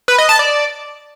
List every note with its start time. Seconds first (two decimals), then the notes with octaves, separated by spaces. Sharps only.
0.08 B4
0.18 D#5
0.29 A5
0.39 D5